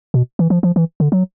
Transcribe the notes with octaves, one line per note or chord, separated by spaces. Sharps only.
B2
E3
F3
F3
E3
D3
F#3